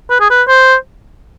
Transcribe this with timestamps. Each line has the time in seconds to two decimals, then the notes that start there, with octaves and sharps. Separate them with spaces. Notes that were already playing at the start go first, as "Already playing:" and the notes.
0.10 B4
0.20 G#4
0.30 B4
0.48 C5